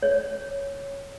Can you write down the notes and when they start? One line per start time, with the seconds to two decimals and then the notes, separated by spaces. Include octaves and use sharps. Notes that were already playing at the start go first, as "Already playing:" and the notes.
0.02 C#5